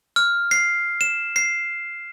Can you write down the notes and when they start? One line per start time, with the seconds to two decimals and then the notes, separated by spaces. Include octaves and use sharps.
0.16 F6
0.51 C7
1.01 E7
1.36 C7